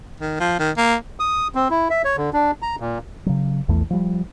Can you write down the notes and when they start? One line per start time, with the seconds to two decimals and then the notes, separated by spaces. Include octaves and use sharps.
0.20 D#3
0.41 F3
0.60 D#3
0.77 A#3
1.20 D#6
1.55 C4
1.70 E4
1.90 E5
2.05 C#5
2.17 D3
2.33 D4
2.62 A#5
2.80 A#2
3.26 C#3 F#3
3.68 A#1 E2 E3 A3
3.90 F3 G3